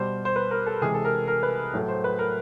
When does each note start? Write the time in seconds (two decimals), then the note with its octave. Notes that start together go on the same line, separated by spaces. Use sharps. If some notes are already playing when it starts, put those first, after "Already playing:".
Already playing: B2 G3 C5
0.25 C5
0.36 B4
0.51 A#4
0.67 A4
0.81 C3 E3 G#3 G#4
0.94 A4
1.05 A#4
1.28 A#4
1.43 B4
1.73 A2 F#3 A3
1.88 C5
2.04 B4
2.19 A#4